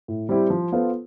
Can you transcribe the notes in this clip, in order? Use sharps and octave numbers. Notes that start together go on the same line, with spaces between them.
A2
G3 C4 E4 G4
F3
B3 F4 A4 C5